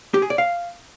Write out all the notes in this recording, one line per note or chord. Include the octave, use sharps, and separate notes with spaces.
G4
G#4
D5
F5